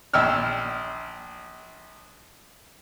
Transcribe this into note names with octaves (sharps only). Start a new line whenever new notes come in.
A#1 G5 E6 F6